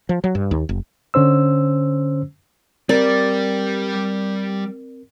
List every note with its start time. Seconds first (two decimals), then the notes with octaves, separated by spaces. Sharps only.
0.09 F3
0.24 F#3
0.35 G2
0.51 D#2
0.69 F#1
1.14 D3 C#4 C5 E6
2.89 G3 C4 G4 A#4 D5